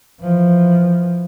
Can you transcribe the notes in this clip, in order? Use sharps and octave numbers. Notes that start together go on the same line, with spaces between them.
E3 F3